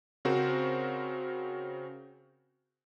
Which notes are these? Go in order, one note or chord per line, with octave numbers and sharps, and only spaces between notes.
C#3 C4 F#4 A#4 C5